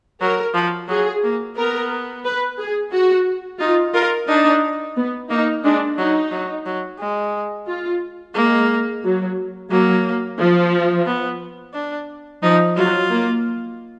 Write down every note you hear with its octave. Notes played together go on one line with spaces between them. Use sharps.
F#3 A#4
F3
F#3 G#4
A#3
B3 A#4
B4
G#4
F#4
D#4 F4
F4 A#4
D4 D#4
B3
A#3 D#4
G#3 D4
F#3 D#4
F#3
F#3
G#3
F4
G#3 A#3
F#3
F#3 A#3
F3
B3
D4
F3 D#4
F#3 F4
A#3